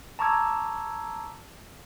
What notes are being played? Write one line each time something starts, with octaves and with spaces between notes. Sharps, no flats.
A5 A#5 C#6 D6 E6 G#6